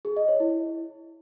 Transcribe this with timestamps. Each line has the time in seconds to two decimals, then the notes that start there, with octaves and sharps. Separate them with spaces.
0.05 G#4
0.17 D#5
0.28 C#5
0.40 E4